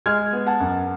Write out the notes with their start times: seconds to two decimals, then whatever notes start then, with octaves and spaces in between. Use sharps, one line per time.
0.06 G#3 F6 G#6
0.33 B3
0.47 F#5 A5
0.60 F#2